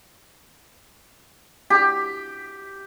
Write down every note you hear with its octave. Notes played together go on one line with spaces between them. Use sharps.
G4